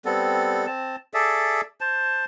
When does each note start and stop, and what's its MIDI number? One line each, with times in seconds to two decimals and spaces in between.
0.05 0.66 55
0.05 0.66 59
0.05 0.66 60
0.05 0.66 69
0.66 0.96 60
0.66 0.96 81
1.14 1.61 68
1.14 1.61 69
1.14 1.61 74
1.14 1.61 76
1.81 2.25 72
1.81 2.25 81